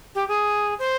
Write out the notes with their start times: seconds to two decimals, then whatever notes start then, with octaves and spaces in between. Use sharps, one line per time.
0.15 G4
0.28 G#4
0.79 C5